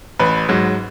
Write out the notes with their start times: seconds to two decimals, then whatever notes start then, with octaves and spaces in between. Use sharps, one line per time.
0.19 A1 B4
0.49 G#2 F#3